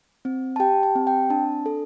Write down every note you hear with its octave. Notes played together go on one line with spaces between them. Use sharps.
C4
A5
G4 G5
A5
C4
G5
D4 A5
A4